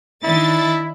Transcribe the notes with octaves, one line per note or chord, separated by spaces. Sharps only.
D#3 D4 E4 A6